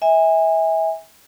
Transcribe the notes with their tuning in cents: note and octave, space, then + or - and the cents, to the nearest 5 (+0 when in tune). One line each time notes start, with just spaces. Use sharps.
E5 -30 G#5 -25